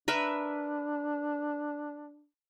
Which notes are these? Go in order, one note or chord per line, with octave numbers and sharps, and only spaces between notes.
D4 A#4 B4 E5